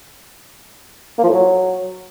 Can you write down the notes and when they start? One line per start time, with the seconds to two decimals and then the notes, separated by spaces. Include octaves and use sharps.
1.18 A#3
1.24 F3
1.29 A2
1.34 F#3